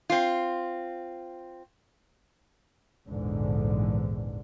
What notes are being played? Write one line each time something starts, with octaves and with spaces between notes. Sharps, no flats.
C4 F4
A#1 E2 G#2 D3